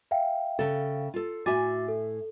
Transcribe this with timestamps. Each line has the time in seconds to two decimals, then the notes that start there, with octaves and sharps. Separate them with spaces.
0.11 E5 F5 G5
0.59 C#3 A4
1.14 F4 A4
1.46 A2 F#4 E5 G#5 D6 A6
1.88 A4